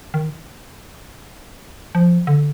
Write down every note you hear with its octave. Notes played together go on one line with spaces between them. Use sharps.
D#3
F3
D3